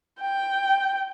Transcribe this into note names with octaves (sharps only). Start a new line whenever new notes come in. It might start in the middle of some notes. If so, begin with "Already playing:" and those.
G5